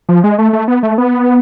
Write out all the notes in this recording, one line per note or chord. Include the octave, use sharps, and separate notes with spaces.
F3
G#3
A3
A3
B3
A3
B3